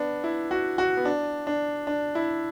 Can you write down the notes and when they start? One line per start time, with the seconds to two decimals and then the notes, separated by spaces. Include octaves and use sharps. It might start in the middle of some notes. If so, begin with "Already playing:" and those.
Already playing: B3 D4
0.24 E4
0.51 F#4
0.78 F#4
0.97 B3
1.05 D4
1.47 D4
1.87 D4
2.15 E4